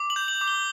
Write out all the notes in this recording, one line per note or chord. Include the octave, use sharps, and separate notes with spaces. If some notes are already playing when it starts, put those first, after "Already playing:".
Already playing: D6
F#7
G6
F#7
D6
G7